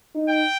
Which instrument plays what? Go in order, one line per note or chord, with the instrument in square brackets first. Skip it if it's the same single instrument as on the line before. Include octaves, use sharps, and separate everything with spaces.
[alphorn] D#4
[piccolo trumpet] G5